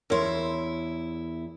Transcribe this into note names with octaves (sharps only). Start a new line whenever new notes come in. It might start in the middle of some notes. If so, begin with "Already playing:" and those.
E2 E4 A#4 C#5 C6